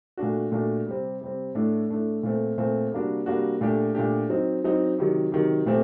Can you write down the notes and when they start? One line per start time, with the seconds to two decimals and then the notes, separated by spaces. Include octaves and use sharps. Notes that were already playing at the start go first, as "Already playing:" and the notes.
0.17 A#2 A3 D4 F#4
0.52 A#2 A3 D4 F#4
0.87 C3 G3 C4
1.21 C3 G3 C4
1.55 A2 A3 D4
1.90 A2 A3 D4
2.23 A#2 A3 C4
2.58 A#2 A3 C4
2.92 C3 G3 A#3 D4 F#4
3.26 C3 G3 A#3 D4 F#4
3.61 A#2 A3 D4 G4
3.95 A#2 A3 D4 G4
4.30 F#3 C4 D#4
4.64 F#3 C4 D#4
4.99 C3 D#3 F#3
5.32 C3 D#3 F#3
5.66 A#2 A3 C4 G4